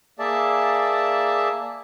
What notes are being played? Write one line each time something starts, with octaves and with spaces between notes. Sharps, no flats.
A#3 G#4 D5 E5 A5